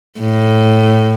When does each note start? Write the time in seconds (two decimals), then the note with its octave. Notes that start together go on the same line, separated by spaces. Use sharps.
0.20 A2